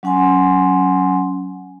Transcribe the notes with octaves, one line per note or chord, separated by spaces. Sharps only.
F#3 C#4 F#5 G#5 C6